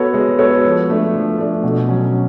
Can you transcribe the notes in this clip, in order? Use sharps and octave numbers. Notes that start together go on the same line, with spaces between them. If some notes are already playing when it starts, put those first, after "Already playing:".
Already playing: B3 F#4 A4 C#5
G#3
B3 F#4 A4 C#5
F3
A3 D4
F3
A3 D4
B2
F#3 C#4